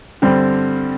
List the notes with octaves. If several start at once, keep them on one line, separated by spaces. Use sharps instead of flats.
G2 D3 G3 C4